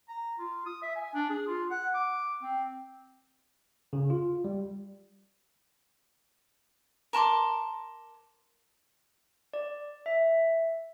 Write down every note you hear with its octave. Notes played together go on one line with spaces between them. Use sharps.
A#5
F4
D#6
E5
G#5
D4
G#4
F4
F#5
D6
C4
C#3
F4
G3
A#4 A5 C6 D6
D5
E5